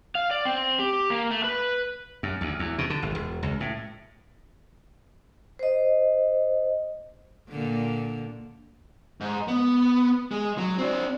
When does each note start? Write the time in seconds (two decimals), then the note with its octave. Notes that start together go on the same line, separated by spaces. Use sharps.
0.15 F5
0.31 D5
0.45 C4
0.79 G4
1.10 A#3
1.31 A3
1.44 B4
2.23 F#2
2.41 D2
2.59 E2
2.78 B2
2.90 D3
3.02 G#1
3.15 E1
3.43 C#2
3.60 A2
5.59 C5 D#5
7.49 A#2 D3
9.21 G#2
9.48 B3
10.31 G#3
10.58 F#3
10.78 C4 D4